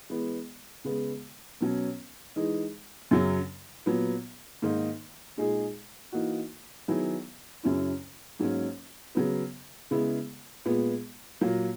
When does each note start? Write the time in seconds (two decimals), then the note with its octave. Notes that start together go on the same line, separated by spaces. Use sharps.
0.10 E3 G#3 B3
0.84 C#3 G#3 B3
1.61 B2 F#3 C#4
2.36 E3 G#3 D#4
3.11 F#2 C#3 F#3
3.86 A#2 F#3 B3
4.62 G#2 D#3 A#3 D#4
5.37 A#2 G#3 D#4 G#4
6.12 E3 A#3 D#4 F#4
6.88 D#3 F#3 B3 E4 G#4
7.63 F#2 C#3 F#3 C#4 E4
8.39 G#2 F#3 A#3 C#4
9.15 C#3 F#3 B3
9.91 C#3 G#3 B3 E4
10.65 A#2 G#3 B3
11.41 A#2 F#3 A#3